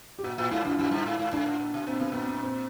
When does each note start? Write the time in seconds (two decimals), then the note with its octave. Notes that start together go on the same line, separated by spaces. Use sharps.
0.19 G4
0.24 A#2 F#4
0.38 A#2 F4
0.51 G#2 E4
0.65 F#2 F4
0.78 F#2 E4
0.91 G2
1.06 G#2
1.19 G#2
1.33 G#2 D4
1.46 A2
1.59 A#2
1.74 B2
1.87 A#2 C4
2.00 B2 B3
2.12 A#2 B3
2.28 B3
2.42 C4